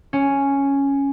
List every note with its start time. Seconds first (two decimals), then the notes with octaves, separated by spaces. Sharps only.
0.13 C#4